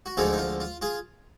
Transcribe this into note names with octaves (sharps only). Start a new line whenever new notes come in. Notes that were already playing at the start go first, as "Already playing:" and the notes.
F#4
D2 D3 F3 G#3 D#4 F4 G#4
D#4
F4
F4
F4 G#4